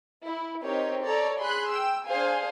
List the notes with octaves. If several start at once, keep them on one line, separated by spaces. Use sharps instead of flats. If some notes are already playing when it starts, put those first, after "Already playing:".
E4
C4 D#4 G4 A#4 C#5
A4 C#5 D5 A#5
G#4 B5 C6 F#6
G5 E6
D4 G#4 C5 F5 G#5